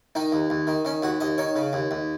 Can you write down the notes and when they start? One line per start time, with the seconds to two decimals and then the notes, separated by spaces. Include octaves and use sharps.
0.15 D#3 D#4
0.32 D#2
0.50 D#2
0.67 D#3
0.85 D#3 C#4
1.03 D#2 F#4
1.20 D#2 D#5
1.38 D#3 C#5
1.56 C#3
1.73 D#2
1.91 D#2